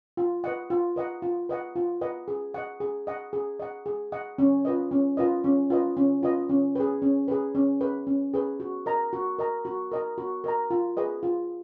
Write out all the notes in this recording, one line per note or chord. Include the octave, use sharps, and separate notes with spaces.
F4
B4 D#5 F#5
F4
B4 D#5 F#5
F4
B4 D#5 F#5
F4
B4 D#5 F#5
G#4
D#5 F#5
G#4
D#5 F#5
G#4
D#5 F#5
G#4
D#5 F#5
C#4
F4 B4 D#5
C#4
F4 B4 D#5
C#4
F4 B4 D#5
C#4
F4 B4 D#5
C#4
G#4 B4
C#4
G#4 B4
C#4
G#4 B4
C#4
G#4 B4
F#4
A#4 D#5 A#5
F#4
A#4 D#5 A#5
F#4
A#4 D#5 A#5
F#4
A#4 D#5 A#5
F4
G#4 B4 D#5
F4